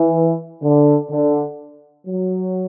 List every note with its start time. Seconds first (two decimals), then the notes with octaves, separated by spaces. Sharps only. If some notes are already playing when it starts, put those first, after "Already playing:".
Already playing: E3
0.61 D3
1.10 D3
2.06 F#3